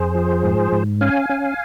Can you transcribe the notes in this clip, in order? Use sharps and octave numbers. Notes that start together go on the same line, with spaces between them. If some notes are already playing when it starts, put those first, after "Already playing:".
Already playing: F2 G#4 C5
F3
G#2
G#2
C#4 F5 G#5
C#4